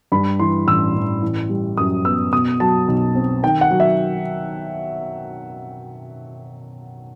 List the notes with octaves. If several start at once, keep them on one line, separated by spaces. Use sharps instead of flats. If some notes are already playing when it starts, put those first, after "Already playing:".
G2 B5
E3 C6
A1 E6
A1
E3
G3
F#2 D#6
B3 E6
B2 D#6
F#3 A5
B1
C4
D#3 G5
F#5
F#3
E5